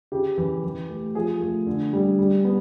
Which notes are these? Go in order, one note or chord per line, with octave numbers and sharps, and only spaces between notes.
C#3 G4
E3
E3
A3
F3 G#4
A3
D3
G3
G3
B3